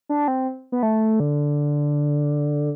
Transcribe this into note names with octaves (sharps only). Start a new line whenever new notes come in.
D4
C4
B3
A3
D3